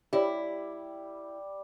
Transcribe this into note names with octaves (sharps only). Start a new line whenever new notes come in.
G3 E4 G4 C#5 D5